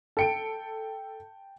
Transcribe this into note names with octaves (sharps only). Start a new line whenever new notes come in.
A4 G5 A5 C#7 D7